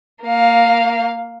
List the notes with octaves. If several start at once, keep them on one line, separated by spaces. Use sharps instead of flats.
A#3 F5